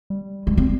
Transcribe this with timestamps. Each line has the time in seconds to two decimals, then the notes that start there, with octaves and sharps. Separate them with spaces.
0.10 G3
0.47 G#3
0.57 C4